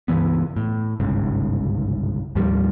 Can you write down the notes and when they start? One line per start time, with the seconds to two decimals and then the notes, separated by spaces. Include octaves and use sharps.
0.08 C#2 G2 E3 B3
0.57 A2
1.00 G1 C2 G#2 C#3
2.35 D#2 A2 F3 G3